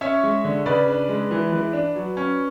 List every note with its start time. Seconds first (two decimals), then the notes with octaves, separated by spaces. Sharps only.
0.01 C#4 C#5 E5
0.23 G#3
0.44 D3
0.66 C#3 B4 D5
0.88 D4
1.09 G#3
1.31 E3
1.52 E3
1.73 D4
1.96 F#3
2.17 C#4